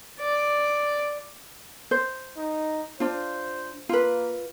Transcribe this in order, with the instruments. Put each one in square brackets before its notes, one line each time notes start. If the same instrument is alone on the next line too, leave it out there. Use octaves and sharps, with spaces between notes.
[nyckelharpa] D5
[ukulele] C5
[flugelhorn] D#4
[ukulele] D4 F4 [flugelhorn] C5
[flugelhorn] A#3 [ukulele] F4 B4